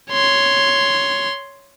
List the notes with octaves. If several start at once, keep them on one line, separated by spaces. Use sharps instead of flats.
C#5 C6